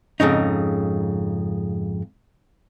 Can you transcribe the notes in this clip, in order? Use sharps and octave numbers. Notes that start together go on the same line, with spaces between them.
F2 G#2 C#3 D#4